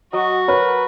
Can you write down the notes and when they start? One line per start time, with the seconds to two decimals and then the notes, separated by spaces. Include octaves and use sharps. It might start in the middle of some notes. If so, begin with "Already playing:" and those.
0.13 F#3 F#4 D#5
0.48 A#4 B4 C#5